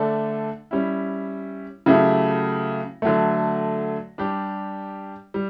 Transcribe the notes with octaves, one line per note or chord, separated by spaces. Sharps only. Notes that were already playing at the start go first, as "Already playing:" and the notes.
Already playing: D3 A3 D4 A4
G3 C#4 E4
C#3 F#3 A3 E4 G4
D3 F#3 A3
G3 D4 G4
G3